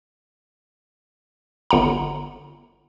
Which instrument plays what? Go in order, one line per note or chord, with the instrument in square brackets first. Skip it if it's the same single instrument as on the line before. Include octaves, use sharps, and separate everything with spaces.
[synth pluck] G1 F#5 A#5